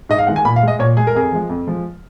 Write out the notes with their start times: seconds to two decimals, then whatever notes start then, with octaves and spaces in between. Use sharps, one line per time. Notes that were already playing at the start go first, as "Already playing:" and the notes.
0.09 G#2 D#5
0.18 F5
0.27 D#3 G#3 F#5
0.36 G#5
0.45 A#2 B5
0.56 F5
0.63 G#3 D#5
0.79 A#2 C#5
0.97 G#3 G#4
1.07 A#4
1.15 F2 G#4
1.32 F3 G#3
1.49 F2
1.67 F3 G#3